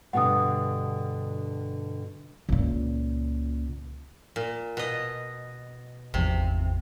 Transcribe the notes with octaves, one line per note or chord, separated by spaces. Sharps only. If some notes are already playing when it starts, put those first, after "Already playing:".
G2 B2 D3 F#5 D#6
C#2 A#2
A#2
B2 D#5
G#1 E2 C3 F3